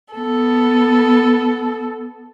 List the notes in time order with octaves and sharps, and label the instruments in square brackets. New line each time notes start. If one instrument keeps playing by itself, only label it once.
[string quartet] B3 A4